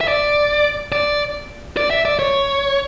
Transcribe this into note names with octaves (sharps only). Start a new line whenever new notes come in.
E5
D5
D5
D5
E5
D5
C#5